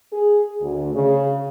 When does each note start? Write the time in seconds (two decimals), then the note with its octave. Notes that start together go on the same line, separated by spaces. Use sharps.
0.12 G#4
0.61 D2
0.94 C#3